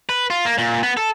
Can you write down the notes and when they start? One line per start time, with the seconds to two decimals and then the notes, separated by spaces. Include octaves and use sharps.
0.09 B4
0.30 F4
0.45 A#3
0.58 A#2
0.83 B3
0.97 A4